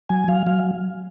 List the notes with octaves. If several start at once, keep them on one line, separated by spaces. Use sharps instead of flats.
F#3 G#5
F#3 F5
F#3 F5